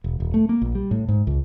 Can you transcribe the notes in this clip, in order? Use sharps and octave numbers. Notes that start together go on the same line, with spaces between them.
E1
D#1
A3
A#3
A#1
G3
A2
G#2
C#2